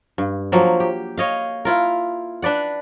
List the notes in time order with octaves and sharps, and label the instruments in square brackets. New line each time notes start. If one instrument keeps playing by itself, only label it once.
[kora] G2
F3 F#3 A#3
G4
C#5 D#5 F5
E4 F4 A#4
D4 B4 D5 F#5